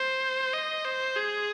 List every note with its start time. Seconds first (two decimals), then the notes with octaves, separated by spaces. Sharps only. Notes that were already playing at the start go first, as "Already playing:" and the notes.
Already playing: C5
0.54 D#5
0.85 C5
1.16 G#4